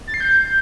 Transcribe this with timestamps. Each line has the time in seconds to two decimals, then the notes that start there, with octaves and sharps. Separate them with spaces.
0.07 A6
0.14 C7
0.20 G6